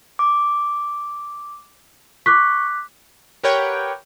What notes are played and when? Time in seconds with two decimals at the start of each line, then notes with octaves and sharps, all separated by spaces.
0.19 D6
2.26 C#6 D6 F#6 B6
3.43 G4 A#4 B4 C#5 F#5 G5